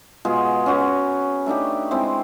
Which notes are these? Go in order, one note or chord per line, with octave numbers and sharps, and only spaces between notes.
B2 G#3 F4 G#4
C#4 F#4 B4
A3 D4 D#4 G4
G#3 C4 E4